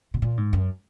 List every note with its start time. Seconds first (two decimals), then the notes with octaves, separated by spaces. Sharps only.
0.14 B2
0.22 A#2
0.37 G#2
0.53 F#2